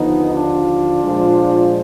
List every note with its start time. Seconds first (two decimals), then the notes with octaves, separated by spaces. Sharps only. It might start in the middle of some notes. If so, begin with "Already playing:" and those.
Already playing: D#2 D3 F3 B3 D#4
0.33 D4 F4
1.04 A#2 F3 G#3